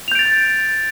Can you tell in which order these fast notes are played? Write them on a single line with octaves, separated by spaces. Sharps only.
F7 G6 D7 A6